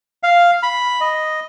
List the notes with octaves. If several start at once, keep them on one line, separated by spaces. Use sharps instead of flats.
F5
B5
D#5